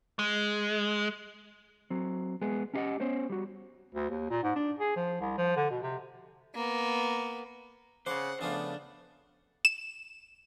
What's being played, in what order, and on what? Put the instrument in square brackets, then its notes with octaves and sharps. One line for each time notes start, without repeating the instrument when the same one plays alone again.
[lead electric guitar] G#3
[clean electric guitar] F#3 C4
G#3 B3 G#4
C#4 E4 G4 A4 D#5 F#5
B3 C#4 C5 C#5
G3 F#4
[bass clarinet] D2
D#2
A#2
G#2
D4
G#4
F3
C2
F3
D3
B2
C3
[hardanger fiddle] A#3 B3
[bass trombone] C#3 [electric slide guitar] C5 [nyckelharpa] F#5 [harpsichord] D6
[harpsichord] C#3 F3 A3 [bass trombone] B3 [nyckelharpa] D4
[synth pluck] E7